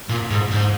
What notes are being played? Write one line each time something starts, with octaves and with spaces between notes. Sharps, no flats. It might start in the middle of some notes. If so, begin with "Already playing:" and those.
A#2
G#2
G#2